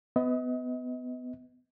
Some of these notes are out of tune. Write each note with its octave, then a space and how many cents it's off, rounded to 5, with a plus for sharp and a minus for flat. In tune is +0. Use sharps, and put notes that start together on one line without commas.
B3 +25 D#5 +35